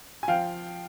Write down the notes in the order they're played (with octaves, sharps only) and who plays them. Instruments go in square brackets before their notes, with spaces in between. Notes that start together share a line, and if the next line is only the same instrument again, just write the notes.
[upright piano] G#5
F3 F5 G5